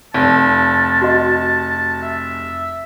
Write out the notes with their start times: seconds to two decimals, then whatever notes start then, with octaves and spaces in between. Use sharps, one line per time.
0.14 F1 A5
1.02 F#4 D#5
2.02 E5